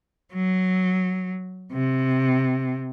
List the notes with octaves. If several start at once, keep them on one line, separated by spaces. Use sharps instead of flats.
F#3
C3